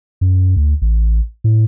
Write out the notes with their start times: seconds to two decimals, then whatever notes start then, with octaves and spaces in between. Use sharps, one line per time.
0.21 F#2
0.57 D2
0.82 A1
1.44 A2